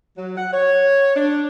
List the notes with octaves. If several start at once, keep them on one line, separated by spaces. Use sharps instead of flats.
F#3
F#5
C#5
D4